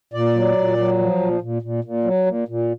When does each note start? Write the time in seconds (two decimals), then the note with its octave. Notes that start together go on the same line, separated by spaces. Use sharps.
0.13 A#2 D5
0.35 F#3
0.57 A#2
0.78 F#3
0.99 F3
1.20 A#2
1.41 A#2
1.62 A#2
1.84 A#2
2.05 F#3
2.26 A#2
2.48 A#2